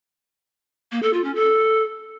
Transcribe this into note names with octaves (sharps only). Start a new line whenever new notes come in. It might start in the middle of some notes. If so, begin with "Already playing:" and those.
A#3
A4
F4
C#4
A4